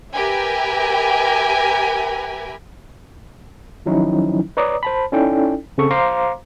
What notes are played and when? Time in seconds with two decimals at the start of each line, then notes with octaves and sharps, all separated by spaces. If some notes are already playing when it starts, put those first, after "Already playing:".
0.14 G4 A#4 B4 E5 G5 G#5
3.86 D#3 F3 F#3 C#4 D#4 E4
4.57 B4 C#5 D5 A#5 D6 D#6
4.83 C5 A5 B5
5.12 C#4 D#4 E4 A4 D5 G5
5.78 C#3 C4 A4 C#6
5.91 C5 F5 A#5 C6 D6